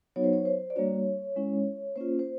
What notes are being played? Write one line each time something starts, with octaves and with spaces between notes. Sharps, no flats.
F#3 B3 D#4 F#4 C#5
C5
C#5
C5
D5
G3 A#3 D4 F#4 C#5
G#3 C#4 E4
A#3 C#4 F4 C5
C5